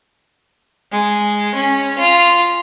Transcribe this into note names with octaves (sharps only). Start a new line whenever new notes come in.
G#3
C#4
F4